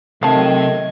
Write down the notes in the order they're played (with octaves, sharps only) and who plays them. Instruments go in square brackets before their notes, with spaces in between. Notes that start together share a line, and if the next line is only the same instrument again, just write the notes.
[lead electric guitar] C3 [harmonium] D#3 A3 [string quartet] F#3 D#5 G#6 [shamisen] F5 A5